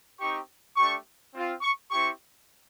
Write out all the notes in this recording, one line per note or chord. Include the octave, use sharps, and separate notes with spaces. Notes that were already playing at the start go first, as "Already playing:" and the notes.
C4 D#4 G4 C#6
A3 D4 G4 C#6
C4 F4
C#6
C4 E4 G4 C#6